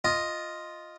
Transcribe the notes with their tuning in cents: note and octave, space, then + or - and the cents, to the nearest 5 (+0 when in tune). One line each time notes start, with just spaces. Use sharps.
F4 +0 D#5 +0